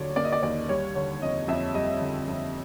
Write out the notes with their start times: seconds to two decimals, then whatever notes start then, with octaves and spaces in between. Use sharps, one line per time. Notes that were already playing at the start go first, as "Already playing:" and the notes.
Already playing: D#2 D3 F#3 C#5 D5
0.16 A#3 D5
0.24 D#5
0.32 D5
0.42 D#2 D5
0.69 G3 C#5
0.95 D3 C#5
1.22 F2 D#5
1.48 F2 E5
1.75 G3 D#5
2.01 D3
2.27 F2